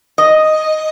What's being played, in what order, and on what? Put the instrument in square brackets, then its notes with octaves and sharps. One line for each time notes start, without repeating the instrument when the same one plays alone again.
[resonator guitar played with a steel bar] D#5